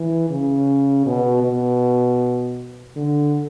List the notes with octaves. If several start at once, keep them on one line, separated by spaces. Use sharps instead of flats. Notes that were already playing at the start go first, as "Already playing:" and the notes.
Already playing: E3
C#3
B2
B2
D3